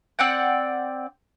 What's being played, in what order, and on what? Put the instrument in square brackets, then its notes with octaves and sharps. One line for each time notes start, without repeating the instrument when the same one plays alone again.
[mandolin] C4 D5 F#5 G5